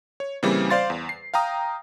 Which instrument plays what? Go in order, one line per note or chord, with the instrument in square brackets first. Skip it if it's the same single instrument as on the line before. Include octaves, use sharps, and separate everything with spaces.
[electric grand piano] C#5
C#3 E3 G3 A#3 C4
C5 D5 F5 C6 A6
E2
C7
F5 G5 A#5 D#6